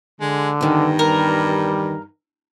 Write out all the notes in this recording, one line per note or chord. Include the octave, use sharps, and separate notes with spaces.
D3 G#3
E2 G2 D#3
G3 A#4